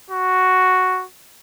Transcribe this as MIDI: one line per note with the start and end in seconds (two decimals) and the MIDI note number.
0.11 1.05 66